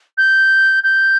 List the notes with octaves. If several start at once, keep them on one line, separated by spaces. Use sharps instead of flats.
G6
G6